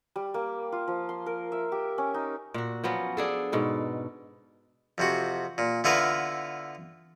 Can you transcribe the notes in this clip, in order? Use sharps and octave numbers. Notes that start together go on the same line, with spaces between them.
G3
A#3
F4
F3
C6
A#4
E5
G4
C#4
D#4
A#2 F#4
F3 F#3 B3 C#4
D4 G#4 A4
G#2 B2 A4
F2 C3 F#4
A#2
D3 B3 E4 F4 A#4 B4